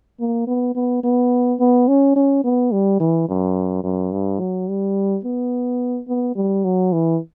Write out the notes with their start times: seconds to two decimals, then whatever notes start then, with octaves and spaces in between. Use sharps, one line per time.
0.20 A#3
0.47 B3
0.75 B3
1.04 B3
1.60 B3
1.88 C#4
2.16 C#4
2.44 B3
2.72 G3
3.00 E3
3.29 F#2
3.84 F#2
4.12 G2
4.40 F#3
4.68 G3
5.25 B3
6.08 B3
6.36 G3
6.65 F#3
6.93 E3